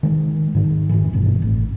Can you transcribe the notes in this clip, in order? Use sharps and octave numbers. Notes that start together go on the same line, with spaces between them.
D#3 G#3
G#2 D#3
F1 D#3 E3
G1 G2 B2
G#1 A2